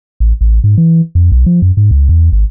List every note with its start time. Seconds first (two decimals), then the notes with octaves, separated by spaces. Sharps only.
0.20 A1
0.41 A1
0.64 G#2
0.78 E3
1.15 F2
1.32 B1
1.46 F3
1.62 F#2
1.77 G#2
1.91 C#2
2.09 E2
2.32 G#1